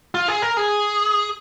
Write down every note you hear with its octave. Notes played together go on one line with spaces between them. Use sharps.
F4
G#4
A#4
G#4